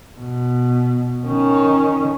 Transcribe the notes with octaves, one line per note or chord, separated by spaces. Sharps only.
B2
D#3 C#4